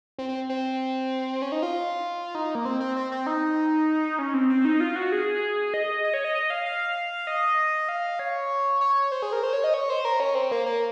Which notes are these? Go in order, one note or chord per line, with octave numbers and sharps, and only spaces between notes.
C4
C4
C4
C#4
D#4
F4
D#4
A#3
C4
C4
C4
C4
D#4
C#4
C4
C4
D#4
F4
F#4
G#4
D#5
D#5
C#5
D#5
D#5
F5
F5
D#5
F5
C#5
C#5
C5
G#4
A#4
C5
C#5
D#5
C#5
C5
A#4
C#4
C4
A#3
A#3